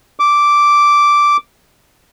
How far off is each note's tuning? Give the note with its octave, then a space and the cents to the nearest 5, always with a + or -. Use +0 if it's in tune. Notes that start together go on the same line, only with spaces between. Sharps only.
D6 -5